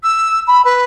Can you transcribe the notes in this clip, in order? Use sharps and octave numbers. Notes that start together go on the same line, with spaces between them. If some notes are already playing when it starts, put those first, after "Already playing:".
E6
B5
B4